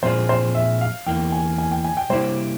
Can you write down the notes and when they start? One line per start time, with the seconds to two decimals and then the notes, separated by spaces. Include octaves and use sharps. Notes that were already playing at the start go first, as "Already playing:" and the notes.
0.03 A#2 F3 C4 F4 G#4 C5
0.29 C5
0.55 E5
0.81 F5
1.06 E2 E3 A#3 G5
1.32 G#5
1.58 G#5
1.72 G5
1.84 G#5
1.97 G5
2.09 C3 G3 A#3 E4 G4 C5